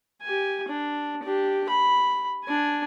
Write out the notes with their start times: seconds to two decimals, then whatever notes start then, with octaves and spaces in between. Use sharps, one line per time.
0.22 G4 G#5
0.68 D4
1.23 D4 G4
1.69 B5
2.45 D4 G#5